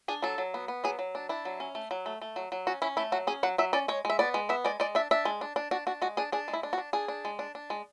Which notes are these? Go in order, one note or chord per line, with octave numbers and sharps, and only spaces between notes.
D4 G#4
F#3 A4
F#3
B3
B3
F#3 G#4
F#3
D4
D4 E4
F#3
C#4
A3
F#3
A3
A3
F#3
F#3
C#4 F#4
C#4 E4
A3 E4
F#3 F#4
C#4 G#4
F#3 F#5
F#3 E5
C#4 D5
G#3 C#5
G#3 E5
B3 D5
G#3
B3 E5
G#3 D5
G#3 D5
D4 E5
D4 E5
G#3
D4
D4
D4 F#4
D4 F#4
G#3 F#4
D4 G#4
D4 G#4
G#3
E4
D4
F#4
D4
D4 G#4
D4
G#3
D4
D4
G#3